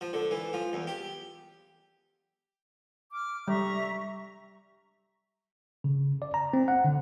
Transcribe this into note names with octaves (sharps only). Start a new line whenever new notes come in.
F3
D3
E3
F3
E2
G4
D6 F6
G3 E5 A#5 C#6
C#3
D5
A#5
C4
F#5
D3